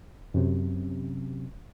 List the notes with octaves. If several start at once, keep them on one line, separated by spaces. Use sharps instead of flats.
F#2 C3